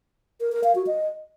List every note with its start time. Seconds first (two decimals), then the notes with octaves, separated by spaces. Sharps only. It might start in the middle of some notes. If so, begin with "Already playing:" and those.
0.41 A#4
0.52 A#4
0.64 F5
0.75 F#4
0.87 D#5